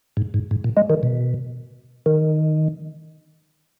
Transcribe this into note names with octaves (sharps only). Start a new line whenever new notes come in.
G#2
G#2
G#2
A#2
G#3
D#3
B2
D#3